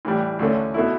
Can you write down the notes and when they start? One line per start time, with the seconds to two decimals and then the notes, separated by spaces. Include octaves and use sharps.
0.05 A2 E3 G3
0.39 D2 D3 A3 C#4
0.74 B2 A3 E4